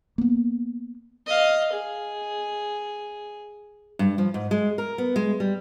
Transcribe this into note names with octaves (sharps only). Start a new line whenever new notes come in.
A#3 B3
D#5 F5
G#4
G2
F3
G#2
G#3
A#4
B3
G#3
G3